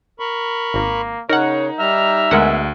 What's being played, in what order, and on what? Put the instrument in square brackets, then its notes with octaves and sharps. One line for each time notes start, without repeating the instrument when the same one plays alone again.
[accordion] A#4 B5 C#6
[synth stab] G#1 [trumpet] A#3
[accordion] C#3 [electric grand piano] D#4 [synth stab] A#4 F#5 [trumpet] C#5
[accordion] G3 A#5 F6 [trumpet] E5
[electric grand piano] D2 [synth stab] G#3 A#4 F#5 [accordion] B3 G#4